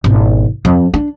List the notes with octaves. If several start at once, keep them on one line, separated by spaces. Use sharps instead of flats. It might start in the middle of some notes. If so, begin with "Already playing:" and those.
G#1 B2
F2
D4